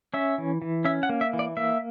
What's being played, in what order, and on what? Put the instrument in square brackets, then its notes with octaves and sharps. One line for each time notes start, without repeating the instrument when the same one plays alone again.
[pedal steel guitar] C#4 E5
E3
E3
C#4 E5
F#5
A#3
E5
E3
D5
A#3 E5